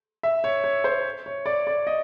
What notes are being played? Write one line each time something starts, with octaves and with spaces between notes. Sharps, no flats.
E5
C#5
C#5
C5
C#5
D5
D5
D#5